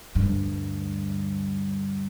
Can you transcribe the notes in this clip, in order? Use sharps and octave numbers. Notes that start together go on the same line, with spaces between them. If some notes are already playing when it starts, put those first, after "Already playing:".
D2 G2